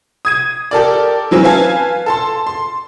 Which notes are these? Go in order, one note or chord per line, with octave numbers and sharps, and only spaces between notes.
D#6 G#6 D#7
G4 A4 A#4 D5
E3 F#3 C4 C#4
B4 F5 G#5 A5
A4 A5 C6
C6